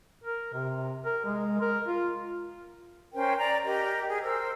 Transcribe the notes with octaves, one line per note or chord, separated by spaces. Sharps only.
A#4
C3
A#4
G#3
A#4
F4
C#4 A#4 C5 G5
D5 A#5
G4 A#4 D#5
G#4
A#4 C5 E6